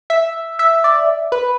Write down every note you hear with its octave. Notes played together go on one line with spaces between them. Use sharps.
E5
E5
D5
B4